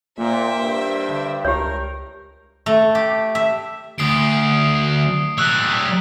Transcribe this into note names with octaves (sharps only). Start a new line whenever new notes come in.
A#2 A#3 C5 E5 G5
G2
D3
C#2 G4 A#4 C#5
A3
G4
E5
D2 D#6 C7 D7
G3 C#5 E6 F#6